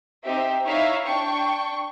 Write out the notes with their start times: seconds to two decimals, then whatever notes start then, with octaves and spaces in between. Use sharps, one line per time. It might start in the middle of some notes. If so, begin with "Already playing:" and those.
0.25 C4 D#4 G4 E5
0.64 D#4 E4 C#5 E5 F5
1.05 D4 G5 C#6